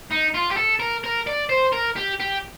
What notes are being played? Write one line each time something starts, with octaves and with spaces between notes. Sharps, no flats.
D#4
F4
G4
A4
A#4
A#4
D5
C5
A#4
G4
G4